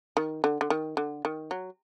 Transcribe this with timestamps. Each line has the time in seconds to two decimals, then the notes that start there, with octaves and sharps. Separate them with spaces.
0.17 D#3
0.44 D3
0.61 D3
0.70 D#3
0.97 D3
1.25 D#3
1.51 F#3